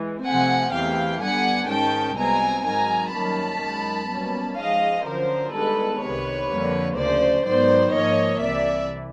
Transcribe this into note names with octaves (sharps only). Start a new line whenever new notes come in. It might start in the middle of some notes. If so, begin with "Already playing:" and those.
Already playing: E3 G#3
C3 F3 A3 C4 F#5 G#5
E2 C3 E3 A3 F5 G5
G2 D3 G3 B3 F#5 G#5
G#2 D#3 G#3 C#4 G5 A5
C2 B2 G#3 C4 G#5 A#5
G#2 D#3 F#3 G#5 A#5
F#2 D#3 G3 A#3 C#4 A5 B5
F#2 D#3 G#3
B2 G3 A#3 C#4
G#2 F3 G#3 D#5 F5
F#2 D3 F3 A#4 C5
G2 D#3 G#3 B3 A4 B4
C2 C3 D#3 B4 C#5
F2 D3 G3 A#3
D2 C#3 F3 C5 D5
G#2 D#3 F#3 B3 C5 D5
G#2 F3 A#3 C#5 D#5
C2 C3 E3 D5 E5